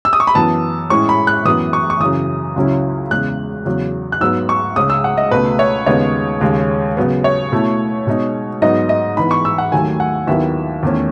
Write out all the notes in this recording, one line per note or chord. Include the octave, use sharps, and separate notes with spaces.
E6
D#6
C#6
B5
F#2 E3 B3 A5
A2 G#3 C#4 E4 C#6
B5
F#6
F#2 E3 B3 D#6
C#6
C#6
F#2 C#3 E3 D#6
C#2 C#3 F#3 C#4 E4
E2 C#3 G#3 F#6
E2 C#3 F#3
F#6
G#2 F#3 B3 E6
C#6
C#2 C#3 G#3 C#4 D#6
E6
F#5
D#5
C#2 B2 A3 B4
C#5
D#2 C#3 G#3 B3 D#4 C#5
D#2 C#3 G#3
C#3 F#3 B3
C#5
B2 A3 E4
B2 G#3 D#4
G#2 F#3 B3 D#4 D#5
D#5
G#2 E3 B3 B5
C#6
E6
F#5
D#2 D#3 F#3 A3 G#5
F#5
D#2 D#3 F#3 B3 E4 E5
E2 D#3 A3 C#4